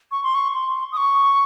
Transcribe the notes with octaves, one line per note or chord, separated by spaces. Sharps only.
C#6
C6
C#6
C6
D#6
C#6